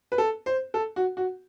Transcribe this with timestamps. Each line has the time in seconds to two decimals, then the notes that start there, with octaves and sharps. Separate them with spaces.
0.12 B4
0.18 A4
0.46 C5
0.74 A4
0.96 F#4
1.17 F#4